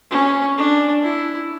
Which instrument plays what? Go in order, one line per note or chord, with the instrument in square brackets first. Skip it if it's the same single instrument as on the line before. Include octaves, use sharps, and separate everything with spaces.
[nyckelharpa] C#4
D4
E4